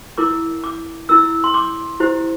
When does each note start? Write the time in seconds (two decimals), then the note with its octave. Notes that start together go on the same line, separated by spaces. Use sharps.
0.18 E4 A#4 D6
0.64 D6
1.09 E4 A#4 E6
1.44 C6
1.54 D6
2.00 E4 G4 C5